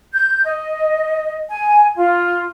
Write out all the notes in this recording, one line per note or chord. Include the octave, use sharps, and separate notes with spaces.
G6
D#5
G#5
F4